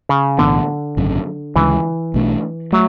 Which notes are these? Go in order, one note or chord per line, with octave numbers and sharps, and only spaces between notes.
C#3
B1 A2 D3 E3 B3
G#1 F#2 C#3
D2 C#3 E3 G#3
B1 B2 A3 D4
F#3 A3